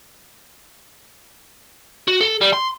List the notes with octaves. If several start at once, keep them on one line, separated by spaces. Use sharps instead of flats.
F#4
A4
G3
C6